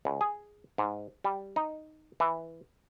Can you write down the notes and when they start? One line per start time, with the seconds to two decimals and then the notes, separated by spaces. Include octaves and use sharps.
0.05 C#2
0.21 G#4
0.78 G#2
1.24 G3
1.56 D#4
2.20 E3